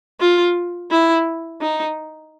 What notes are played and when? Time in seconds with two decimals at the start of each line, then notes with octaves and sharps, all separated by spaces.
0.20 F4
0.91 E4
1.61 D#4